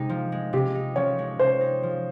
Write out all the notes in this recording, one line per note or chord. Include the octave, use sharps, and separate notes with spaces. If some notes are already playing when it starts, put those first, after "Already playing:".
Already playing: C3 G#3 D#4
F3
G#3
C3 G4
D#4
F3 C#5
G#3
C3 C5
D#4
F3